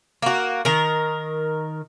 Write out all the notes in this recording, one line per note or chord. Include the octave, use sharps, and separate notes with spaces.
A#3 F#4
D#3 A#4